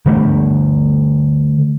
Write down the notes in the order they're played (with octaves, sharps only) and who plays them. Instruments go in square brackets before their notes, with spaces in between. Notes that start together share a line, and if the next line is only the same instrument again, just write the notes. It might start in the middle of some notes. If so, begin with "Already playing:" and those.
[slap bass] D3 G3 A3